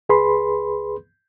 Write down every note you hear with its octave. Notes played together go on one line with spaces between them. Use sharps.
C#2 G#4 B4 B5 C6